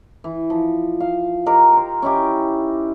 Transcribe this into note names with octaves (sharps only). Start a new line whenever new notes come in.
E3
F3
F5
D#4 G4 A#4 C5
A#4 C5
C#4 D#4 E4 G4